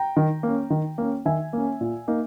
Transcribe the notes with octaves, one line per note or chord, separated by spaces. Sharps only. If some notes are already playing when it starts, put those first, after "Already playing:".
Already playing: G5 A#5
D#3
A#3 C#4
D#3
A#3 C#4
D#3 E5 G#5
A#3 C#4
A#2
A#3 D#4